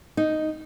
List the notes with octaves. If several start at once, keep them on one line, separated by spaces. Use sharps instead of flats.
D#4